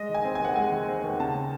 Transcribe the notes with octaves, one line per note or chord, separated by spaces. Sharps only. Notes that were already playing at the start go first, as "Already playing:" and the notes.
Already playing: G#3 D#5
D#3
G#5
C4
G#5
D#2 F#5
G#3 G#5
D#3
C4
D#2
C#3 A5